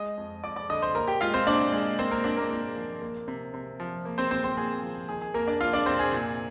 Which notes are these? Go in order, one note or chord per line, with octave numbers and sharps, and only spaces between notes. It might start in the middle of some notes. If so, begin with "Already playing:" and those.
Already playing: G#3 D#5 D#6
F2
F2 D5 D6
D5 D6
D3 D#5 D#6
C5 C6
A#2 A#4 A#5
G4 G5
G#3 F4 F5
C4 C5
A#2 D4 D5
G#3
A#3 C4 C5
A#3 A#4
A#2 D4 D5
A#3 A#4
A#2 A#3 A#4
F3
A#3
C3
C3
F3
A#3
C4 C5
A#2 C4 C5
C4 C5
A#2 G#4
F3
D#3 G#4
G#4
F2 A#3 A#4
D4 D5
F2 F4 F5
D4 D5
C3 C4 C5
G#4
A#2